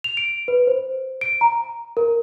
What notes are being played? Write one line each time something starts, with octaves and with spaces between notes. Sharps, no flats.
F7
D7
B4
C5
D7
A#5
A#4